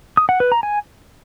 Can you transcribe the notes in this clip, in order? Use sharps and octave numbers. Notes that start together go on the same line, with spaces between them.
D#6
F#5
B4
A#5
G#5